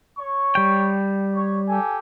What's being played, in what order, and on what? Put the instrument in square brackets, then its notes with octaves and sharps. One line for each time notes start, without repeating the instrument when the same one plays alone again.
[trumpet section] C#5 C#6
[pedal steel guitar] G3 G5
[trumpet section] C#5
G4 A4 G#5